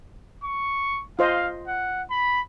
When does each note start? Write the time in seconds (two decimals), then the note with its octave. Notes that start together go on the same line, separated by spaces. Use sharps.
0.44 C#6
1.19 F4 C5 D#5 F5
1.67 F#5
2.10 B5